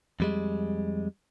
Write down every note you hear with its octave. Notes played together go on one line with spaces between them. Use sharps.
F2 G3 G#3